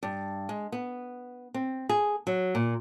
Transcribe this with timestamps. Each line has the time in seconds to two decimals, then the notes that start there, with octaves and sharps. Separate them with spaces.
0.03 G2
0.49 G#3
0.72 B3
1.54 C4
1.89 G#4
2.27 F#3
2.55 A#2